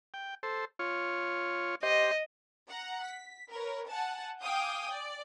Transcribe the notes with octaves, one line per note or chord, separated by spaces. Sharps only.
G5
A4 C5
F4 C#5
G4 C5 D#5
F#5 A#5
B6
A#4 B4 C#5
F#5 G#5 A5
F5 G5 G#5 D6 D#6 G6
D5